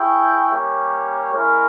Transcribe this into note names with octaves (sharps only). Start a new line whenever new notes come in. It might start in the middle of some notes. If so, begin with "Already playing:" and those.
Already playing: E4 G#4 C#5 G5
G3 A#3 C#4 G4 C#5
G#3 C#4 E4 A#4